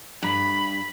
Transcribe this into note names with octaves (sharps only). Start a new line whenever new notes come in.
G2 B5